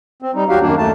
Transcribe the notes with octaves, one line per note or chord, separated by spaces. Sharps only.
C4
G3 D#4
D#2 F#3 F#4 G4 F5
F#2 D#3 A#3 D4
D#2 A3 A5